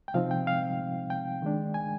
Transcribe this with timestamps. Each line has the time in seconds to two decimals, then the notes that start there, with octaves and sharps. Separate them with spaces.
0.08 G5
0.14 C3 F3 C4 D#4 F5
0.31 G5
0.47 F5
1.10 G5
1.42 D#3 G#3 D4
1.74 G#5